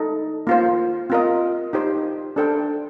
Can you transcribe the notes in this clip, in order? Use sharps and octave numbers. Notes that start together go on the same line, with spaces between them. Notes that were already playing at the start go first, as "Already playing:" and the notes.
Already playing: D#4 A4 D#5
A#3 F4 C5
C4 F4 A#4 D#5
D#4 G4 C5
D4 A4 C5 G5